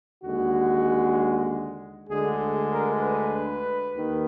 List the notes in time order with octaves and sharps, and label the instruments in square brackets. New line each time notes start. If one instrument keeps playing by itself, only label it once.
[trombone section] D#2 D3 G#3 F#4
D2 D3 G#3 G#4
A#4
B4
D#2 D#3